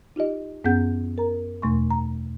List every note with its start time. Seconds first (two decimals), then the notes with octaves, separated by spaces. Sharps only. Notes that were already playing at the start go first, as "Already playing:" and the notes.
0.16 D#4 F4 G4 D#5
0.64 F#2 B3 C#4 G#4 F#5 G6
1.18 A#4 A#5
1.62 E2 B2 A3 C6 C#6
1.90 A#5